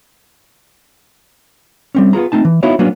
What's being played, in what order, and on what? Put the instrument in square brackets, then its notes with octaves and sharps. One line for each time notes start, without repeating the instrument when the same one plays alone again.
[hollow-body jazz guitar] G3 C4 C#4
B3 F4 G#4 A#5
A3 C4 D#4 A5
E3
B3 D#4 E4 F#4 C#5 F5
F#3 A#3 B3 C#4 D4 F#4